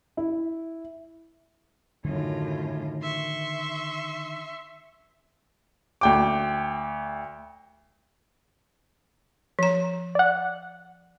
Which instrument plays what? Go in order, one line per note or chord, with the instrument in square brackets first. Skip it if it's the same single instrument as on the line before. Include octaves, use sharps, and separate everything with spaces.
[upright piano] E4
[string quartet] F#2 A2 F4 [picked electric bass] D3 D#3
[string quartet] E5 C6 C#6
[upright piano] D2 G5 D6
[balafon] F3 A#5
[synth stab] D5 F#5